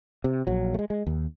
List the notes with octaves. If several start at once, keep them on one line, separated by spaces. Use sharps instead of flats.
C3
A#1 F#3
G#3 A3
G#3
D#2